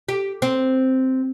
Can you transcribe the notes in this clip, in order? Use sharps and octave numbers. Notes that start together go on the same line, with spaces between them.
G4
C4